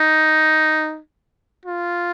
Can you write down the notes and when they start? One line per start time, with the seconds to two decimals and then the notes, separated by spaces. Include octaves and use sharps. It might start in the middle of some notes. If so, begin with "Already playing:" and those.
Already playing: D#4
1.66 F4